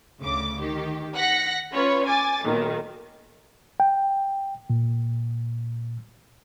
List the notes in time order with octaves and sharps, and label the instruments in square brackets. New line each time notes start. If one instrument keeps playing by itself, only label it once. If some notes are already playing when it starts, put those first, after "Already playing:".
[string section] D2 C#3 D6
D#3 G4
F#5 F#6 A#6 B6 C#7
C#4 F4 B4 C#5
G#5 D6 A6
B1 A#2 D#3
[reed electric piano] G5
A#2